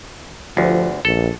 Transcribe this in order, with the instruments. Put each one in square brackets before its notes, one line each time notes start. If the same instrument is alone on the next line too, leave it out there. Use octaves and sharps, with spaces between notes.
[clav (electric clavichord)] G1 D2 [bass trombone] F3
[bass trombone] A#1 [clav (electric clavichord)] A4